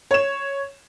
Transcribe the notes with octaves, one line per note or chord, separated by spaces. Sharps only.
C#5 E7